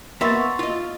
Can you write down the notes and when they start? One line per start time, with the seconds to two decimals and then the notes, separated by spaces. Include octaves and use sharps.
0.21 A#3 B3 E5 C6 C#6 A6
0.59 F4 D#5